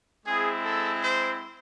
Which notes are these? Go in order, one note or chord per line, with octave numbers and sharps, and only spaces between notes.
G#3 C4 E4 G#4
A4
C5